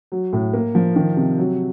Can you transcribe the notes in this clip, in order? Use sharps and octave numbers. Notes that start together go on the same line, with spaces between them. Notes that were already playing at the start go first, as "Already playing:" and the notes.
F#3
A2
A#3
F3
D#3
C3
F#3